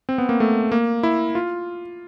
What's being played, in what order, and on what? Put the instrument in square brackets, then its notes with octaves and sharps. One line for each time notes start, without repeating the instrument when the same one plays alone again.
[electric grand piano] C4
B3
A#3
A3
A#3
E4
F4